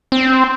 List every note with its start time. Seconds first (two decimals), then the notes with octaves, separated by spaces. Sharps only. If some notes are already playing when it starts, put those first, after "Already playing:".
0.12 C4